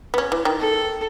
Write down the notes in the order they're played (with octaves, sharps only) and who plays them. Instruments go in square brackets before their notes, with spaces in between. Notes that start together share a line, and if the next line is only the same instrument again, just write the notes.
[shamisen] B3
C#4
E3
D#3
[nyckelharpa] A4